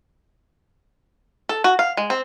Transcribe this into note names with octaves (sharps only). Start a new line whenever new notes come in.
A4
F#4
F5
G#3
C4